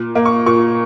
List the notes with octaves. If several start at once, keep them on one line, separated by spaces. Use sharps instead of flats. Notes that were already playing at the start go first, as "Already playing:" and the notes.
Already playing: A#2
A#3
C#6
A#2 C#6